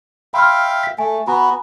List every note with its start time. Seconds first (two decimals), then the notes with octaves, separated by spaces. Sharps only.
0.34 E5 F5 G5 B5 C6 F6
0.83 B6
0.98 A3 G#5
1.27 B3 F#4 G#5 A#5 B5